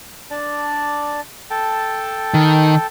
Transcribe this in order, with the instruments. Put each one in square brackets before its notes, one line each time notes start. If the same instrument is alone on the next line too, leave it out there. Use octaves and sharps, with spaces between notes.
[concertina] D4 D5 A5
A4 G5 A5
[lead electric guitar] D#3